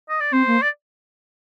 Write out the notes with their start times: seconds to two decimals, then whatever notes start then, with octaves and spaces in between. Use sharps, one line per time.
0.10 D#5
0.20 D5
0.32 C4 C5
0.47 A#3
0.62 D5